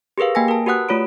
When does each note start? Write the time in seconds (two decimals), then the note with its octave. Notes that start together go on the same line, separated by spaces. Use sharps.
0.18 G4 G#4 A#4 B4 F5
0.35 A#3 G5 G#5 A#6
0.48 A#4 A5
0.66 F#4 G4 B4 F#5 D#6 F#6
0.89 A3 F4 C#5 B5 D7